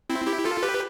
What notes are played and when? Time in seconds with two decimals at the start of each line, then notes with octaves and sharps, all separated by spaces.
0.10 C4 E4
0.27 E4 G4
0.45 F4 A4
0.63 G4 B4